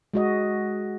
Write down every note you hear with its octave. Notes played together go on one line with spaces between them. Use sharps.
G#3 F#4 D#5